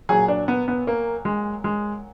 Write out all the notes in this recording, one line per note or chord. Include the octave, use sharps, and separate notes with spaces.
A#2 F#3 G#4
D4
B3
B3
A#3
G#3
G#3